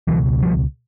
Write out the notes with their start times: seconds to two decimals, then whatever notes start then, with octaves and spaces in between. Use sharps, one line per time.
0.07 C#2 B2 E3 F#3
0.42 F3 G3